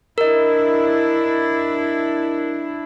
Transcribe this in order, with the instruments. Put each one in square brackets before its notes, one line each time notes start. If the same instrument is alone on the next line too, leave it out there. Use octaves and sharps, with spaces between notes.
[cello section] D4 E4 [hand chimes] A#4 D#5